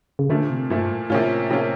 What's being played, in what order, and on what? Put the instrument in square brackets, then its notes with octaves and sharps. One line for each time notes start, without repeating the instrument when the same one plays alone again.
[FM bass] C#3
[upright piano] A#2 F3 A3 [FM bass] D3
[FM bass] C3
[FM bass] G2 [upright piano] A#2 F3 A3
[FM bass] A2
[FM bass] A2 [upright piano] C3 F3 A#3 C#4 F4
[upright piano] C3 F3 A#3 C#4 F4